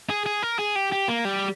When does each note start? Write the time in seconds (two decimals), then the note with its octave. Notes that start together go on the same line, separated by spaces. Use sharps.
0.10 G#4
0.26 G#4
0.43 A#4
0.59 G#4
0.76 G4
0.92 G4
1.08 A#3
1.25 G3